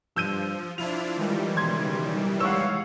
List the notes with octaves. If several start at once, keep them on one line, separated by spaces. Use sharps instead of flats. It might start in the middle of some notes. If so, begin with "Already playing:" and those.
G2 F3 E6 G6 D#7
F3 D4 E4 F4 F7
D#3 E3 G3 G#3
B1 C#3 C6 G#6
G#3 C#5 F5 F#5 C#6 E6